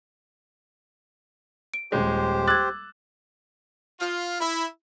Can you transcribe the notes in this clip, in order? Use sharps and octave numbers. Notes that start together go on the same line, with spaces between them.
D7
D#1 G#3 G4 C5
D6 E6 F#6 G#6 A6
F4
E4